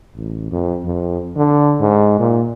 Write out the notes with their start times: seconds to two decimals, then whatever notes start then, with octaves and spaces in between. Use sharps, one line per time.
0.15 A1
0.52 F2
0.85 F2
1.36 D3
1.80 G#2
2.19 A#2